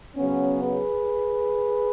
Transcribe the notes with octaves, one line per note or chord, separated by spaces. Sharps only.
C#3 F#3 B3 C#4
G#4 B4